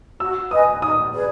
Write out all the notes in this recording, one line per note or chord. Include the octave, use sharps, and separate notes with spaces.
F#4 E6
B4 D#5 G#5 D#6
D#4 D#6
G#4 B4 D5